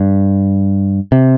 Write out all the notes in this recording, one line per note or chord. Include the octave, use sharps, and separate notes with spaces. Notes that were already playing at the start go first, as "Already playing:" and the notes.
Already playing: G2
C3